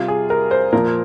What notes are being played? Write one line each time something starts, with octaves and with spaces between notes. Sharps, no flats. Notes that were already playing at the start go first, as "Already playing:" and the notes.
Already playing: C3 G3 F4
G#4
A#4
C5
A#2 F3 A#4